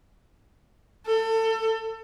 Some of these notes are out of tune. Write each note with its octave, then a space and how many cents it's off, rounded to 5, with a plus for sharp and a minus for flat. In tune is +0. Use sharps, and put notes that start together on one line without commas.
A4 +30